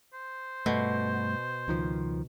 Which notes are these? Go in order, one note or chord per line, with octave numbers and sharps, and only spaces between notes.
C5
G2 B2 A3
C#2 D#3 F3